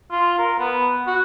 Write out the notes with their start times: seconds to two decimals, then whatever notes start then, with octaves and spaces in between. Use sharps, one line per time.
0.11 F4
0.39 A#4
0.59 B3
1.07 F#4